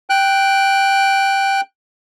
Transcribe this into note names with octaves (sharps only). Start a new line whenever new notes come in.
G5 F#6